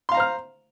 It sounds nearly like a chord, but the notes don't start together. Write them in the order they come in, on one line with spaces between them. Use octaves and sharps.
C6 F5 A#5 C5 F6